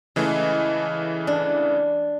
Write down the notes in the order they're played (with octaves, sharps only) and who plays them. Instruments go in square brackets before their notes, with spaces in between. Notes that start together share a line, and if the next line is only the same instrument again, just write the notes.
[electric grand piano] C#3 E3 A3 [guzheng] G#3
[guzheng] D4